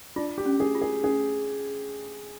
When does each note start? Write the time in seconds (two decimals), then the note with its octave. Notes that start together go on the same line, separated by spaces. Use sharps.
0.16 D4 F4
0.38 G4
0.46 C#4
0.60 G#4
0.75 F4
0.81 G#4
1.04 C#4 G#4